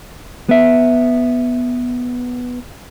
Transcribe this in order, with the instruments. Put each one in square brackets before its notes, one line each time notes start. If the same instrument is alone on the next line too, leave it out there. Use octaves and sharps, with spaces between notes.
[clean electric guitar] B3 E5